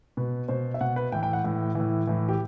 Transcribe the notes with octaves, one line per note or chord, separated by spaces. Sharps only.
B2 B4
B2 C5
E5
B2 F#5
B4
A2 E3 G5
G5
F#5
A2 E3
A2 E3
A2 E3
G4